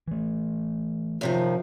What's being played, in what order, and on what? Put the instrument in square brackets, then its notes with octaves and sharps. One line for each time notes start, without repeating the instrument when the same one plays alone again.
[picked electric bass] E3 A3
[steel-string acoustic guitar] F#2 C3 D#3 [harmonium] F3